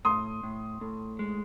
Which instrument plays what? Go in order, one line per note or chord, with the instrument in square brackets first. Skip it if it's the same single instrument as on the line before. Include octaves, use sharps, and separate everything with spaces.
[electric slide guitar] A2 [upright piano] C6 D#6
[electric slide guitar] A2
A2
G#3